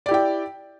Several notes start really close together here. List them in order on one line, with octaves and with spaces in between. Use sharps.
D5 G4 E4 G5